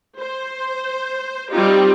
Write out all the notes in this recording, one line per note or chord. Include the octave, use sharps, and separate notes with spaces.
C5
G3 C4 D#4 F4 G4